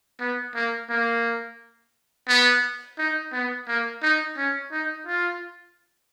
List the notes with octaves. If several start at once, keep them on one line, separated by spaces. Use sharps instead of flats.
B3
A#3
A#3
B3
D#4
B3
A#3
D#4
C#4
D#4
F4